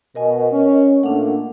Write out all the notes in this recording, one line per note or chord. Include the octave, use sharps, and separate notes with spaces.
B2 A#4 D#5 G#5
C#4
A#2 A3 A#3 D4 F#5